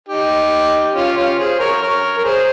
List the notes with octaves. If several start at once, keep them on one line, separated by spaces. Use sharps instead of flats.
D#4 G4
C#4 F4
G4
C#4 F4
G#4 C5
A#4 C#5
A#4 C#5
A#4
G#4 C5